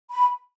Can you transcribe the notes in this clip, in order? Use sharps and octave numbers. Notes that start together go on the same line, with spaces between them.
B5